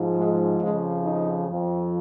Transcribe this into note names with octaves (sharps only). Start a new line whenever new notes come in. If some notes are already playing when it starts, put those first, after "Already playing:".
Already playing: G#2 F3
G#3
F2 C#3 F3 G#3
D#4
F2 F3